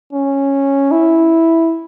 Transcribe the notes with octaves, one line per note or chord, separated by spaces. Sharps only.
C#4
E4